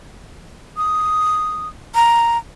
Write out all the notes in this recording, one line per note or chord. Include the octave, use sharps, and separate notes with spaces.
D#6
A#5